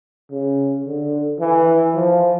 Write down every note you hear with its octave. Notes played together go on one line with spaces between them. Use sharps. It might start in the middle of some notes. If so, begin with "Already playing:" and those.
C#3
D3
E3
F3